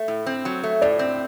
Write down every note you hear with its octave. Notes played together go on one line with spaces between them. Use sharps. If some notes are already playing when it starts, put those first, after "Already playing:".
Already playing: A3
A2
C4
F#3
A3
A2 D5
C4